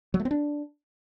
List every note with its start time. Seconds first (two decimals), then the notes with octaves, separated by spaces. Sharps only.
0.14 F#3
0.20 A3
0.25 C4
0.31 D4